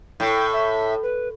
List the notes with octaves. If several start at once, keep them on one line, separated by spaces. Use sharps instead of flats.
A2 G5
E5
B4